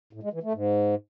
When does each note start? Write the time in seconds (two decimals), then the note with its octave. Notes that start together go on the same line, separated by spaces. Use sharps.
0.13 A2
0.23 G#3
0.33 E3
0.43 A3
0.53 G#2